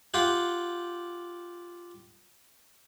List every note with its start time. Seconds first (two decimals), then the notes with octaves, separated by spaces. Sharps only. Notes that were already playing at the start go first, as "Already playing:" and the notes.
0.14 F4 G4 F#5